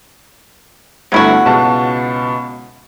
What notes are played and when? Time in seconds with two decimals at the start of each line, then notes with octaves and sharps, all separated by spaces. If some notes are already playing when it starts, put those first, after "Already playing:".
1.12 G1 G2 F#3 A3 E4 F#4
1.46 C#2 B2 A5